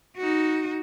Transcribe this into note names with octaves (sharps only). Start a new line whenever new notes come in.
D#4 F#4